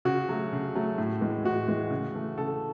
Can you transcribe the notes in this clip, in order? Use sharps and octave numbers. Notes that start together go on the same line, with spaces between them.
C#3 F#4
F#3 A3
C#3
F#3 A3
A2
E3 G#3
A2 F#4
E3 G#3
C#3
E3 A3
C#3 A4